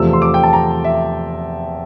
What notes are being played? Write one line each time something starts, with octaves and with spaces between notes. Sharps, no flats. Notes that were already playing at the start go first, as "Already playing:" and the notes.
Already playing: E2 C3 F3 A3 E6
C6
D6
G5
A5
A#5
E5